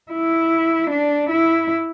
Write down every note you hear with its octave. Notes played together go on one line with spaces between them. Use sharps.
E4
D4
E4